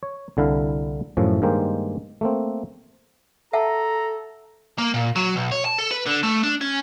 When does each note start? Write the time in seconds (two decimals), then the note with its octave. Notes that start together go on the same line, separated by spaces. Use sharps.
0.03 C#5
0.37 C2 D3 E4 F5
1.17 F#2 A2 E3 F3
1.42 G2 D#3 G#3 A#3 C5 G5
2.21 A3 A#3 C4
3.53 A4 E5 F#5 A5 A#5
4.78 A#3
4.94 A#2
5.16 F#3
5.36 B1
5.52 C#5
5.65 A5
5.78 A4
5.91 B4
6.06 D3
6.23 A3
6.43 D4
6.61 C#4